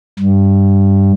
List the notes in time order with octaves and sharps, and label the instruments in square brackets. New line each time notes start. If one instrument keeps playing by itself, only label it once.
[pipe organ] G2